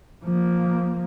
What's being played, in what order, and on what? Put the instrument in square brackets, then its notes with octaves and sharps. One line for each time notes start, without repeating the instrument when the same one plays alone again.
[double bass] F3 A#3